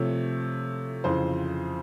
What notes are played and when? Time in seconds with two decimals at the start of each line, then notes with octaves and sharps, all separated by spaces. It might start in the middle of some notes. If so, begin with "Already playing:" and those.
Already playing: C3 F3 A3 C#5
1.04 F2 C#3 E3 C5